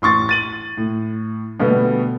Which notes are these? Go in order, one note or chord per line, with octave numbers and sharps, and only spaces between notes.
A1 C6 C#6 A6
A6 D#7 F#7
A2
B2 D3 G3 A3 B3